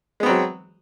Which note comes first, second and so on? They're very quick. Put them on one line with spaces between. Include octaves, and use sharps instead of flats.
G#3 B3 C4 F#3